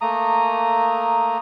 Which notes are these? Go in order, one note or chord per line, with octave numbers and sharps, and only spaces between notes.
A3 A#3 A#5 D#6